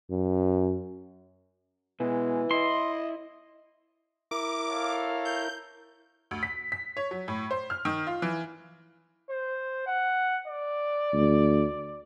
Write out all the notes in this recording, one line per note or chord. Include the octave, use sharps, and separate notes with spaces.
F#2
B2 E3 G#3
E4 D#5 C6
E4 A#4 D6
A4 C#5 F5
G6
D2
B6
B6
C#5
F#3
A2
C5
F6
D#3
F4
E3
C5
F#5
D5
D2